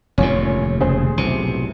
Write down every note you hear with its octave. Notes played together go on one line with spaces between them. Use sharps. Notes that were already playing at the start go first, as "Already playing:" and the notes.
F1 A#1 D#2 A2 C#4
E1 C#3 G#4 C5
B1 A2 C3